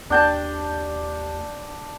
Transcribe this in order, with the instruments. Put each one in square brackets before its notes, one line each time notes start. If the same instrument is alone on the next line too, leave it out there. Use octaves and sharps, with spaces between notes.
[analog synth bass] D#2 [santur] D4 G5 A5